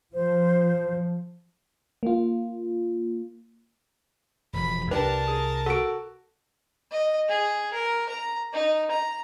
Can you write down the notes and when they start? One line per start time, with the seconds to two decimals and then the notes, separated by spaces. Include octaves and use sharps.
0.14 F3 C5
2.03 A#3 F4
4.53 E1 F3 B5
4.91 C2 D4 G4 A#4 B4 A5
5.27 G#4
5.66 F#4 A4 C#6 E6 D7
6.91 D#5
7.29 G#4
7.74 A#4
8.10 A#5
8.53 D#4
8.92 A#5